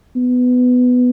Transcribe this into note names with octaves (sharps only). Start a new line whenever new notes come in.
B3